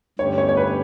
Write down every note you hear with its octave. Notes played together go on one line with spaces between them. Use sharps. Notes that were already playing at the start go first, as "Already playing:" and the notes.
G2 D3 A3 C#4 G4 C#5
C#5
C#5
B4